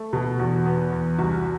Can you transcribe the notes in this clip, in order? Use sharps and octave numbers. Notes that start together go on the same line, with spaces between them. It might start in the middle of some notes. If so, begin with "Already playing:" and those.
Already playing: A3
B2
E2 F#4
B3
E2
C2 F#4